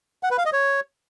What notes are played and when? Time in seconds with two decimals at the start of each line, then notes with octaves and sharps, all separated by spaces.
0.23 F#5
0.31 B4
0.38 F5
0.45 D#5
0.53 C#5